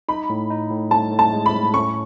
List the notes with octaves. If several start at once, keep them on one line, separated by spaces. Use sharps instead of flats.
D#4 B5
A2
D#4
A2
A2 A5
A2
A5
G#3
B5
A2
C#4 C#6